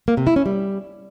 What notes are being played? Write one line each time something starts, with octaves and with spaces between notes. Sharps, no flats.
A#3
C3
E4
C#4
G3